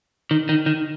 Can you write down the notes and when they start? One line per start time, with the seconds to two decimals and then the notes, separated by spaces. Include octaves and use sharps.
0.31 D#3
0.49 D#3
0.66 D#3